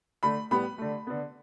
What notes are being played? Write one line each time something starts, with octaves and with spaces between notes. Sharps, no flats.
D3 A3 B5
A2 G3 B3 B5
D3 A3
D3 B3